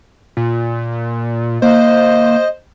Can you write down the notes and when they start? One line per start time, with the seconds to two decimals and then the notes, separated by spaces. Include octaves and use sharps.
0.37 A#2
1.62 A#3 C5 D#5